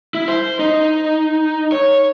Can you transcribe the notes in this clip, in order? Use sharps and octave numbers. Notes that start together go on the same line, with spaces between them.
E4
C5
D#4
C#5